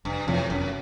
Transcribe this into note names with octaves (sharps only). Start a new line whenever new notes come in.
F1 G2
F2 A2 C3 F3
F1 F#2